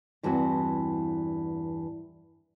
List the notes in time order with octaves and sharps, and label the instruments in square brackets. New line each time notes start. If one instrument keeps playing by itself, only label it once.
[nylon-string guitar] E2 G2 E3 C4 F#4